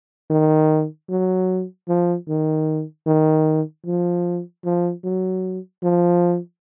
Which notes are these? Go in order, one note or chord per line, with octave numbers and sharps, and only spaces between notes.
D#3
F#3
F3
D#3
D#3
F3
F3
F#3
F3